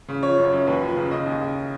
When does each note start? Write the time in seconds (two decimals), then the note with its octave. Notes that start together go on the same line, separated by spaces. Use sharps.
0.09 C#3
0.23 F3 C#5
0.37 F#2
0.45 C#5
0.53 F#2
0.67 D#2 B4
0.82 F3
0.89 B4
0.96 C#3
1.11 C#3 D#5
1.26 D#2
1.41 C#3